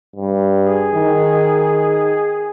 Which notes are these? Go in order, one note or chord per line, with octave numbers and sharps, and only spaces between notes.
G2
G#4
D#3